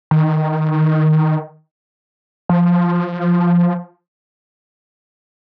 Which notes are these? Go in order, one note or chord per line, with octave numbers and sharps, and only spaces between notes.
D#3
F3